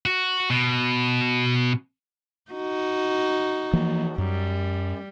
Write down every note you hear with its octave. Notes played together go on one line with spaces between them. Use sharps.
F#4
B2
D#4 F#4
E3 F3 A#3
F#2 G3